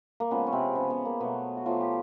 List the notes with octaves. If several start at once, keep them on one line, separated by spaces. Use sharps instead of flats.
A#3
C#3 F3 G#3 B3
C#4
C3 C4
C#3 F3 G#3 B3
B3
A#3
B2 F#3 A3 B3
F#4
B2 F3 F#3 A3 F4
G4